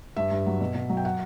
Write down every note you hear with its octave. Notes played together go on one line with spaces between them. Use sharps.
G2 E5
G2
F#3
B2
B2
F#3
G5
F#5